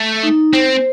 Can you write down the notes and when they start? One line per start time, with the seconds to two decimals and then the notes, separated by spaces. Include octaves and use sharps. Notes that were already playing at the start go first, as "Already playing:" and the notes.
Already playing: A3
0.23 D#4
0.53 C4 C5